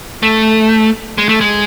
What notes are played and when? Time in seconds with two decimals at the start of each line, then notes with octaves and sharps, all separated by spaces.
0.23 A3
1.18 G#3
1.29 A3
1.41 G#3